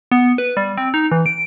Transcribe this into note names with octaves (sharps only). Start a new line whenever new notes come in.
B3
B4
G3
C4
D#4
E3
D7